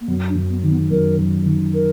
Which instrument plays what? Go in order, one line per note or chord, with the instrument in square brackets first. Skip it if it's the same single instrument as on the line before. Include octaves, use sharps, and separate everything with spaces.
[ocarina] A#3
[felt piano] F#2 [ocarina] B3
[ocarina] D4
[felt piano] F#2
[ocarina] B3
[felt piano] D#3
[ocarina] B3
[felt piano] F#2 [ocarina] A#4
[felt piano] F#2
D#3
[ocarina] A#4